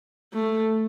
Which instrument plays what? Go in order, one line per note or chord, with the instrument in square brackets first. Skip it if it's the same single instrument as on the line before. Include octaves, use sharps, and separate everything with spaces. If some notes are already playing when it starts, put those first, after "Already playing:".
[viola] A3